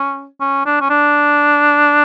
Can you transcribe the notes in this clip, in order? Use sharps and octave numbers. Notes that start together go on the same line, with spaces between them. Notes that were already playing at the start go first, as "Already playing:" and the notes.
Already playing: C#4
C#4
D4
C#4
D4